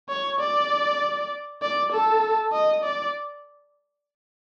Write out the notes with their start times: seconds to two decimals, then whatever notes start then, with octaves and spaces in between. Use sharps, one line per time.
0.09 C#5
0.40 D5
1.62 D5
1.92 A4
2.53 D#5
2.84 D5